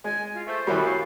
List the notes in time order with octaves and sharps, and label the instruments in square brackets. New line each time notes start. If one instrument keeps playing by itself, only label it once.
[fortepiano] G#3 [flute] G#5
[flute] F4
[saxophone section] A3 [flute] C5
[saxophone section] F#2 [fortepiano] E3 G3
[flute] F5